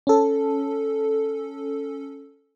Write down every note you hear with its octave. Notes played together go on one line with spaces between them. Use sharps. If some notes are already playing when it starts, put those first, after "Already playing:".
C#4 A4